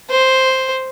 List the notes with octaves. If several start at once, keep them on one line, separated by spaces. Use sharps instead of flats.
C5